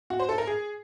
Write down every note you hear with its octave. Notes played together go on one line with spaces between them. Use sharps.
F#4
C5
A4
A#4
G#4